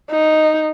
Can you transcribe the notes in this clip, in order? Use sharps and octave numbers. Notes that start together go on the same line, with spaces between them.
D#4